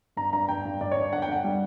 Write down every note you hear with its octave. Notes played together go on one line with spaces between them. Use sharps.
G2 A#5
G2 A#5
G2 G5
G2
G2 D5
C#5
G2
D3 F#5
G5
G2 F#5
G3